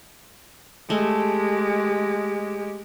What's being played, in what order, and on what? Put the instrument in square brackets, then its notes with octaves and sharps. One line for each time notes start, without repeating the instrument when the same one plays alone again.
[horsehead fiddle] G#3 G4 [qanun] A3